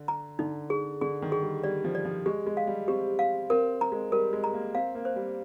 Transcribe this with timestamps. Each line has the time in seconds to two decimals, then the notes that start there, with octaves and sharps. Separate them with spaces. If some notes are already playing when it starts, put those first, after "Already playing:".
Already playing: D3
0.08 A#5
0.39 D3 D#4
0.70 G#4
1.01 D3 G#4
1.22 D#3
1.32 G#4
1.42 G3
1.64 G3 D5
1.84 F3
1.95 D5
2.05 F3
2.26 G#3 G4
2.47 G#3
2.57 F5
2.67 G3
2.88 C4 G4
3.19 F5
3.50 C4 A#4
3.81 A#5
3.92 G#3
4.12 G3 A#4
4.33 G#3
4.44 A#5
4.54 A#3
4.74 C4 F5
4.95 A#3
5.05 C5
5.16 G3